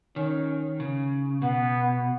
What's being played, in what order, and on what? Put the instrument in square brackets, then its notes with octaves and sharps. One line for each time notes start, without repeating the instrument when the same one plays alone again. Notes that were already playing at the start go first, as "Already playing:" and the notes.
[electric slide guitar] D#3 [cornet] C#4
[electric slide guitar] C#3
[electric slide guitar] B2 [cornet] B3